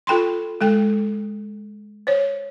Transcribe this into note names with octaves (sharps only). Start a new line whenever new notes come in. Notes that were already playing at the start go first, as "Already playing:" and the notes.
F4 A4 G5 B5 C6
G#3 A4 G5
C5 C#5